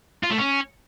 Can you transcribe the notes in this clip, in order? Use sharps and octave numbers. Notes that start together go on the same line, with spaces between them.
F4
A3
C#4